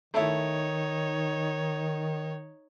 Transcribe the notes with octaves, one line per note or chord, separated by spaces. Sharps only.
D#3 A3 D#4 E4 C#5